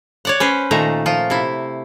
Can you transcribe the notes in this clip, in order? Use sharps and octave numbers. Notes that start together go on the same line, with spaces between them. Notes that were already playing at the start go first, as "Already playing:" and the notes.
C#5 D5 F#5
C#4 B4 C5
A#2 D#3 A3 A#5
F3 F4
C3 E4